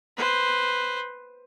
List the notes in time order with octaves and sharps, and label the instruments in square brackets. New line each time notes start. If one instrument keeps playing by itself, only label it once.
[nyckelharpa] B4 C5